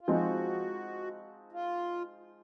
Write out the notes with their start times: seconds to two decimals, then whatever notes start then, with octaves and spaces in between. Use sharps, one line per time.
0.01 F4
0.08 F3 G#3 C4 D#4 F#4
1.52 F4